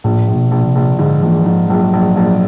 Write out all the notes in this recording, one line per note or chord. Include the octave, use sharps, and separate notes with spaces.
A#1 A2
A#1
B2
A#1
C3
A#1
G#2 D3
A#1 E3
G#2 F3
A#1 F#3
A#1
A#1